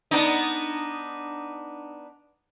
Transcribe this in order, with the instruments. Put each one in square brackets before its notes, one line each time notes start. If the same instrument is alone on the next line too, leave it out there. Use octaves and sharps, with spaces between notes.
[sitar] B3 D4 D#4